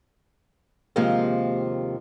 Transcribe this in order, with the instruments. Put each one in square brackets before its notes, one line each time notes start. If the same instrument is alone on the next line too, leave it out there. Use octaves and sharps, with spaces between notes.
[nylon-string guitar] D#2 C3 F3 G#3 A#3 C4